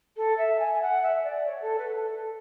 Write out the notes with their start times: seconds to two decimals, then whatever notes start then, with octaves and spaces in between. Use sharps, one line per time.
0.16 A4
0.38 E5
0.59 G#5
0.74 G#5
0.81 F#5
1.03 E5
1.24 D5
1.46 C#5
1.62 A4
1.78 B4
1.94 A4
2.11 A4